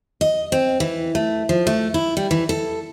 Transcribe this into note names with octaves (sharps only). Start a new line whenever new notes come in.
D#5
C4
E3
A3
F3
A3
E4
G3
E3
A4